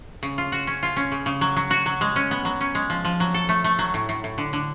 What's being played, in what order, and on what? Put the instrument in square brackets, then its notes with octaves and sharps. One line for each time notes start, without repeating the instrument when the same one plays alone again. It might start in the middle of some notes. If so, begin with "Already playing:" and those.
[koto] C#3
F4
F#4
C#4
F4
C#4
C#3
C#3
F#3
F#3
F#4
F#3
G#3
C#4
B3
F#3
C#4
G#3
F3
F3
F#3
A4
A3
A3
F#3
A2
A2
A2
D3
D3